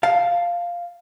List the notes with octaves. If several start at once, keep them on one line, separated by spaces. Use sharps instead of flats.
F5 A5